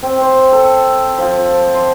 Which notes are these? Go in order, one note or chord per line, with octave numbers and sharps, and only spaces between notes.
C4
C5
A4
F3
C6